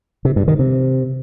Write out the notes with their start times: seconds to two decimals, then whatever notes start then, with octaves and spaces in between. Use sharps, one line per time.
0.25 C3
0.36 G2
0.48 D#3
0.59 C3